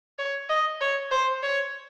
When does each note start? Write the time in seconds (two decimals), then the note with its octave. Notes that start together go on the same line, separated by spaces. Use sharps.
0.19 C#5
0.49 D#5
0.81 C#5
1.12 C5
1.43 C#5